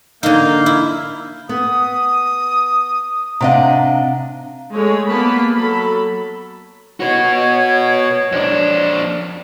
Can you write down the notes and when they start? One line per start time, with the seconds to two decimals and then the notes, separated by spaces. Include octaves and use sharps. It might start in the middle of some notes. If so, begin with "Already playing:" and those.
0.23 D3 A#3 D#4 F5 G6
0.66 E4
1.49 B3 D#6
3.41 C3 D4 D#5 F5 F#5 A#5
4.74 G#3 A3 C#5
5.08 A#3 B3 A5 B5
5.55 F#3 A4 B5
7.00 F#4 B4 C#5
8.32 F2 D4